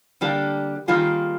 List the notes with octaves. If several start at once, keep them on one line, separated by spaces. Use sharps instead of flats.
D3 G3 A#3 D4 G4
D#3 G3 A#3 F4 G#4